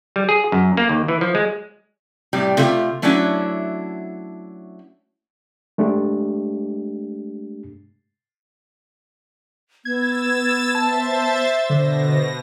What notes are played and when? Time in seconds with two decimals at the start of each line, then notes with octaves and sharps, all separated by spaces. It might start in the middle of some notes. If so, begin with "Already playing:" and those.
0.16 G3
0.29 G#4
0.52 F#2
0.77 A#3
0.89 D#2
1.08 E3
1.21 F3
1.35 G#3
2.33 A2 C3 G3
2.57 C3 A3 F4
3.02 F#3 A3 C#4 D4 E4 F#4
5.78 G#3 A3 D4 G4
9.85 B3 E6 G#6 A6 E7
10.75 C5 E5 A5 A6
11.70 B2 D3 C5 A#6